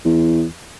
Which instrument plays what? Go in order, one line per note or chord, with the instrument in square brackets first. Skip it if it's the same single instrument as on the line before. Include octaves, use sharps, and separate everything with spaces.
[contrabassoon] E2